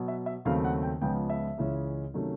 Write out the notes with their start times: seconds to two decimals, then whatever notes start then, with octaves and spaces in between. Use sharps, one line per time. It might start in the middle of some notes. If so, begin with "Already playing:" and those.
Already playing: B2 F#3 B3
0.08 E5
0.26 E5
0.45 D#2 C#3 F#3 A3 C4 F5
0.64 F#5
0.83 G5
1.01 C#2 C#3 F3 G#3 B3 G5
1.30 E5
1.58 C#2 C#3 E3 G#3 C#4
2.14 C3 D#3 F#3 A3 C#4